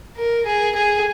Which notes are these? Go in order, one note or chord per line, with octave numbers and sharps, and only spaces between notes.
A#4
G#4
G#4